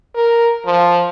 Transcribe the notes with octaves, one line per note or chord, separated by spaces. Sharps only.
A#4
F3